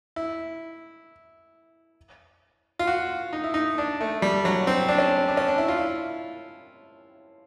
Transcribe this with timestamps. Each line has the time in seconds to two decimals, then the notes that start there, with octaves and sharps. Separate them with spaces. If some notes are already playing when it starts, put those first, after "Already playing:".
0.16 E4
2.79 F4
2.87 F#4
3.33 D#4
3.44 E4
3.54 D#4
3.78 D4
4.01 A3
4.22 G3
4.45 F#3
4.67 C4
4.88 D4
4.98 C#4
5.28 D4
5.37 C#4
5.48 D4
5.58 E4
5.68 F4
5.78 E4